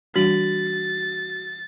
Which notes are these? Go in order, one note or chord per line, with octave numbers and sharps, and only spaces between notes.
E3 G3 D4 F#4 A6 B6 F#7